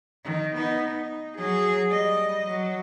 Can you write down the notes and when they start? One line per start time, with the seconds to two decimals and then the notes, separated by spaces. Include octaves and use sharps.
0.24 D#3
0.56 B3 D#4
0.91 D#4
1.37 F#3 G#4
1.89 G3 D#5
2.47 F#3